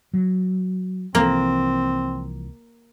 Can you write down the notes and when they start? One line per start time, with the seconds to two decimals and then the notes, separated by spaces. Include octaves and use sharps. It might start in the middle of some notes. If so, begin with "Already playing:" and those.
0.13 F#3
1.15 C2 E3 F3 A#3 C4